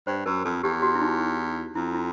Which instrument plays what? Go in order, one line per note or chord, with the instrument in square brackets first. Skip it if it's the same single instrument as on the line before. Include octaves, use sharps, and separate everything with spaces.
[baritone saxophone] G2 [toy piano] C5
[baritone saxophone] F#2 [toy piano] A#4
[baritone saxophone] F2 [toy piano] A4
[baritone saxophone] E2 [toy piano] G4
[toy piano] F#4
E4
D#4
[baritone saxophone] F2 [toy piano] E4
[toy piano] E4